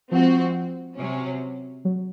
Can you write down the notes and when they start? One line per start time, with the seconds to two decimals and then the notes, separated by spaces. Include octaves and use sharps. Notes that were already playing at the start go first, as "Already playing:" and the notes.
0.11 F3 G#3 C4 F#4
0.98 C3 F#3 C#4
1.85 F#3